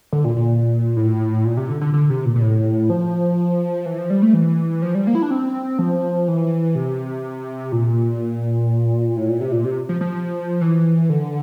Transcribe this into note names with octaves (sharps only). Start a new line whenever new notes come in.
D3
A#2
A#2
A2
A#2
C3
D3
D3
D3
C3
A#2
A#2
A2
F3
E3
F3
G3
A3
E3
F3
G3
A#3
E4
D4
C4
F3
E3
C3
A#2
A2
A#2
C3
A#2
C3
F3
F3
E3
D3